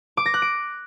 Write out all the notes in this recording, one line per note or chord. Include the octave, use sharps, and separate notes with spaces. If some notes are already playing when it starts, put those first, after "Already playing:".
D6
A#6
F#6
D7